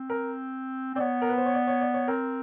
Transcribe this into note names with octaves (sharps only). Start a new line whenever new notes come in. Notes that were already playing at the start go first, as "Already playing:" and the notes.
Already playing: C4
A#4
C4 D5
B3 C#5
A#4
B4
C5
C#5
D5
C#5
D5
C#5
C4 A#4